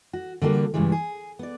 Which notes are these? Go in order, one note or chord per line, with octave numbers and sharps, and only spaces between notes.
F#4
D3 G3 A#3 F#4 A#4
G2 A#2 C#3 E3 G3 G#3
G#4
B3 D5